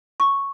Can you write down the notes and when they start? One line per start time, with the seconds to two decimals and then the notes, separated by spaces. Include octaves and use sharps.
0.20 C#6